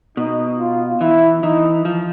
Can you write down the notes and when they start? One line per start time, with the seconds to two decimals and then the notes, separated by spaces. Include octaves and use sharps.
0.17 B2 D#4
0.59 F4
1.01 E3 E4
1.43 E3 D#4
1.85 F3